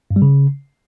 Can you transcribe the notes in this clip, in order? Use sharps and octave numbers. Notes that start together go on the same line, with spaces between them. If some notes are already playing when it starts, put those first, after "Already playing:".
G2
G3
C#3